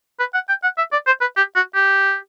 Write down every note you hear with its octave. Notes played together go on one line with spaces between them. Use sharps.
B4
F#5
G5
F#5
E5
D5
C5
B4
G4
F#4
G4